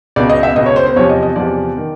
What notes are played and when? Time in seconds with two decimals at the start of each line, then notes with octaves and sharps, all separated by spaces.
0.16 C#2 B2 D5
0.30 D#5
0.43 E5
0.56 C#2 B2 D#5
0.66 C#5
0.76 C5
0.86 C5
0.96 E2 C3 F3 C#5
1.09 D#5
1.23 D#5
1.36 E2 C3 F3 D5
1.78 D#3